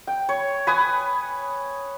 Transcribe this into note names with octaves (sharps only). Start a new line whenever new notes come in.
G5
C#5
B4 G#5 D#6